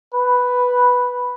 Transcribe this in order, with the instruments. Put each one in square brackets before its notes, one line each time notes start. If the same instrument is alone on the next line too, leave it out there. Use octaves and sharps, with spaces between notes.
[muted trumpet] B4